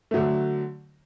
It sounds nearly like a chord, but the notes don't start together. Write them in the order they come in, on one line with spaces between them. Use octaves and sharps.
A3 F#3 D3